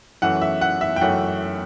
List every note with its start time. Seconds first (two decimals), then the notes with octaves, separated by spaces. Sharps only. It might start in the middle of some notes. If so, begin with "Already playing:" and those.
0.22 F#2 E3 A3 C#4 F#5
0.41 E5
0.61 F#5
0.81 E5
0.96 G5
1.01 F#2 E3 A3 C#4 F#5